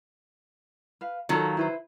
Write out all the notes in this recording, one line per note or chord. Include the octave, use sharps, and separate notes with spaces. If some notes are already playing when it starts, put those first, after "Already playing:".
B4 F5
D#3 F#3 F4 A4
E4 B4 C5